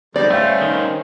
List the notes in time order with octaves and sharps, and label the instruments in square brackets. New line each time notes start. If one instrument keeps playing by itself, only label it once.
[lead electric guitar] D2 G2 [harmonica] G3 G#3 D#4 [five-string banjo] D5
[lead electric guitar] G3 C#4 [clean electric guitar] A3 [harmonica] C5 F5 G5
[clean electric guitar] D#3